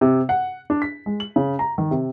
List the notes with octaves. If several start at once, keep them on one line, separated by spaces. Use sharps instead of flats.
C3
F#5
D4
B6
G#3
F#7
C#3
A#5
D#3
C3